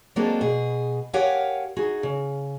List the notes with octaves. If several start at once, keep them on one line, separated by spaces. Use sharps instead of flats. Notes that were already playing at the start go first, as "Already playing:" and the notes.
F#3 G#3 A#3 C4 D4 A4
B2 G#4
G4 A#4 C#5 F5 F#5 G#5
D#4 F#4 G#4
C#3